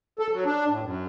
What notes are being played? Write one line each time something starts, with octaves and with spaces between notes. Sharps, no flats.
A4
F#3
D4
A2
F#2